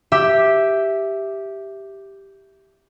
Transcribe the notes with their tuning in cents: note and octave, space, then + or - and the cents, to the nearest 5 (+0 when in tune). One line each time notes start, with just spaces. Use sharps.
G4 +0 E5 +0